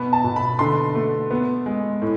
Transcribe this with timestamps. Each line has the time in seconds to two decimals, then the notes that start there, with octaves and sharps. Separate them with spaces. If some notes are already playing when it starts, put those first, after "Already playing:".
Already playing: B2 B3 B5
0.13 A5
0.24 B2
0.36 B5
0.59 D3 C6
0.95 A3
1.31 B3
1.66 G#3
2.02 A2